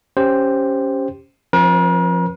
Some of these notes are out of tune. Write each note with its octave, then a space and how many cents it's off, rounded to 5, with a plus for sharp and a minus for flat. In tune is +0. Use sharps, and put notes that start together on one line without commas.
C#4 +5 G4 +0 C5 +0
F3 +0 C4 +35 A#4 +45